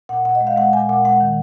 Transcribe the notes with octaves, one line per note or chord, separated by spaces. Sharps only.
A#2 F#5
A#2 F#5
D#5
G#3
F5
G#3 F#5
A#2 G#5
A#2 F#5
G#3 F#5
D#3